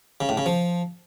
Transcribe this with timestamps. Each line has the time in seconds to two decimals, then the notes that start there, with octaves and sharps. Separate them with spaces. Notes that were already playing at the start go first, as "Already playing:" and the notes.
0.21 C#3
0.29 A2
0.37 C#3
0.46 F3